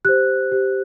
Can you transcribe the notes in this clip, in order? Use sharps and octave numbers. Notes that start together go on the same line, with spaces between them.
G4 C5 F#6
G4 C5